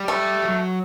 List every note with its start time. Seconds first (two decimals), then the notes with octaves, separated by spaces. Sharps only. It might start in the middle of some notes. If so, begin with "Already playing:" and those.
Already playing: G3
0.08 A3
0.43 F#3